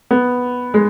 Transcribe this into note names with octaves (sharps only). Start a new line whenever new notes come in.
B3
G#3